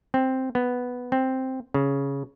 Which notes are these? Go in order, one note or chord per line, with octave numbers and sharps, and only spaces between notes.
C4
B3
C4
C#3